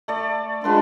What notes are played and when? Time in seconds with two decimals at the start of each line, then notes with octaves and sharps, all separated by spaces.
0.08 A3 D5
0.64 G#3 D4 F4 B4 C6